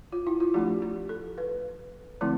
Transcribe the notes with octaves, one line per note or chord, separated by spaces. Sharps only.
F4
E4
F4
F3 A3 D4 G4
G4
A4
B4
D3 F3 A3 C4 E4